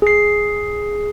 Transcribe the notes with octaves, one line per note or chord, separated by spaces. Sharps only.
G#4 C7